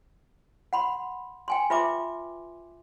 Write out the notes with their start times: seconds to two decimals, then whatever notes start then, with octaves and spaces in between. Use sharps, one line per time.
0.73 F#5 B5 C6
1.48 G5 G#5 C6
1.70 F4 B4 E5 C6 D6